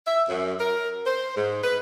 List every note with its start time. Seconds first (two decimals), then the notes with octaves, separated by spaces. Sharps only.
0.06 E5
0.28 F#2
0.60 A#4
1.06 C5
1.36 G#2
1.63 B4